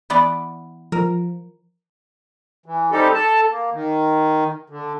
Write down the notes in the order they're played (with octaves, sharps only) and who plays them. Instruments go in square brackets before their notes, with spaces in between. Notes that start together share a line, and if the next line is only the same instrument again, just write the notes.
[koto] E3 B3 D5
[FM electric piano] F3 [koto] A#4
[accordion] E3
G3 C4 D#4 G4 A4
A4 A5
A#3
D#3
D3